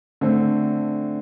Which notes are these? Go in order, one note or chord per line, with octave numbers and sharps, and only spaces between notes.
D3 A3 C4